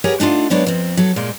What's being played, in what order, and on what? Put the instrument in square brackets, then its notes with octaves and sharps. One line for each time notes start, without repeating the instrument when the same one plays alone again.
[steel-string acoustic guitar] G4 G#4 A#4 B4 C#5 F#5
A3 D4 D#4 F4 F#5
F#3 G#3 B3 D4 C5 C#5
F2 C4
F#3 A4
A#2 G#3 A#3